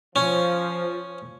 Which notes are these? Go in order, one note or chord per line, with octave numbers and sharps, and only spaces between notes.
F3 C#4